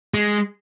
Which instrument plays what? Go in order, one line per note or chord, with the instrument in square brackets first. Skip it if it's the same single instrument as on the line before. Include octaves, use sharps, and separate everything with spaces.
[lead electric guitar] G#3